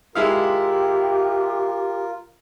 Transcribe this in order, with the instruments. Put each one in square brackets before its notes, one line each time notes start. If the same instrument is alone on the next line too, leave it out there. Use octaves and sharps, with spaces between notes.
[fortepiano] G#3 E4 F5 [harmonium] F4 A#4 [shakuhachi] G4